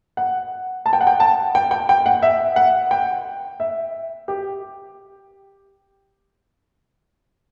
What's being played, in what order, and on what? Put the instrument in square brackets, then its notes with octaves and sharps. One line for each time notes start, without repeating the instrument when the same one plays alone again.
[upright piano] F#5
A5
G5
F#5
G5
A5
G5
G5
G5
F#5
E5
F#5
G5
E5
G4